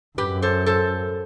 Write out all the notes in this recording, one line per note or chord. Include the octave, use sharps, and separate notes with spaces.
F#2 G4 B4
A4 C5
A4 C5